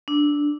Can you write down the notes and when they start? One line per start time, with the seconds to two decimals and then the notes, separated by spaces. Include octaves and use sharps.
0.08 D4